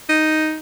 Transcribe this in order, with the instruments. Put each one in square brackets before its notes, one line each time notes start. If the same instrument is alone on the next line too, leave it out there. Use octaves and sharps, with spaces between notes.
[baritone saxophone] D#4